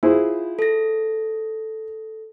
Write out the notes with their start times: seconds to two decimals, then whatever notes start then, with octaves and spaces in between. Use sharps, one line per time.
0.03 E4 F4 G#4 C5
0.59 A4 A#6